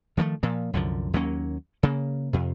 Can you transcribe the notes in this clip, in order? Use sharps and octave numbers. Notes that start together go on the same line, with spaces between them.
D#3 F3 G#3 A3
A#2 F3
C2 F#2 D3 F3
D#2 F#3 A#3 C#4
C#3 A#3
F2 C3